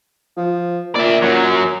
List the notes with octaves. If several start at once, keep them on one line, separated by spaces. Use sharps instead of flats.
F3
A#2 D5 E5
F#2 F#3